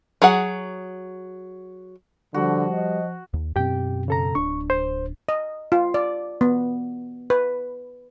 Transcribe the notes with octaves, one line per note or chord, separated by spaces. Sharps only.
F#3 G#4 F#5
D3 F3 G3 F#4
D#5
D#2
F#2 B2 C4 G4 G5
C#3 A4 A#5
D1 D4 C#6
C5
D#5
F4
D5
B3
B4